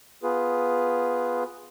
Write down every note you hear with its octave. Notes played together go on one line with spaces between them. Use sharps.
B3 F4 G#4 B4